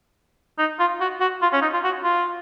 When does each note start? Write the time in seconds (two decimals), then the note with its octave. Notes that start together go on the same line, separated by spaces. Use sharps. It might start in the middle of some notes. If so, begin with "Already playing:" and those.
0.59 D#4
0.79 F4
1.01 F#4
1.21 F#4
1.42 F4
1.53 C#4
1.62 D#4
1.74 F4
1.84 F#4
2.04 F4